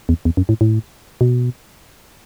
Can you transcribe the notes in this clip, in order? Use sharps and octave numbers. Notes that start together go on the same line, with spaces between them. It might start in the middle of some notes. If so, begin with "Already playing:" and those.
E2
E2
F#2
A2
A2
B2